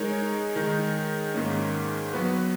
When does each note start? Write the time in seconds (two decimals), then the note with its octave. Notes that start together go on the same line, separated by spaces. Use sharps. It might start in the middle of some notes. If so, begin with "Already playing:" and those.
Already playing: G#3 D#4 A#4 C#5
0.56 D#3 G#3 D#4
1.34 G#2 D#3 A#3 C#4
2.13 F#3 B3 F#4 B4